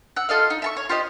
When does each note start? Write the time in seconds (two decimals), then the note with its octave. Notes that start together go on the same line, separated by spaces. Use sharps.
0.16 F#5 E6
0.29 F4 A4 D#5 F5
0.50 D#4
0.62 E5 A5 C#6
0.77 C#5
0.89 F4 G4 C5 D#5